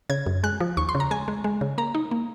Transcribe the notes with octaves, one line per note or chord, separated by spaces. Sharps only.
C#3 G#6
F#2
G#3 F#6
F3
D#2 C#6
C6
C#3
A#5
G#3 G#5
G#3
G#3
C#3
A#3 A#5
D#4
A#3